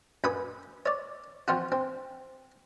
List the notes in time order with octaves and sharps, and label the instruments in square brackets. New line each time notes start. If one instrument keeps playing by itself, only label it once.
[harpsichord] F#2 B4 B5 D#6
C#5 D5
F3 C4 F4 F#4
C4